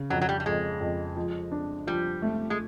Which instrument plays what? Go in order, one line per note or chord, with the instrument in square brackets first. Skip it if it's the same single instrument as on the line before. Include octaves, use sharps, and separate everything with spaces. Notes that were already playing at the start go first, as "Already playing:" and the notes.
Already playing: [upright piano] C#3
[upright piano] F2 [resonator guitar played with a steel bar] F#3
[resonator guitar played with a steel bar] F#3
G3
G3
[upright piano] F2 [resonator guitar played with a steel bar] G#3
[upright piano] F2
F3
D4
[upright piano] F3 [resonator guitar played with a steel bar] G3
[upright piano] A3
[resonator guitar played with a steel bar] G#3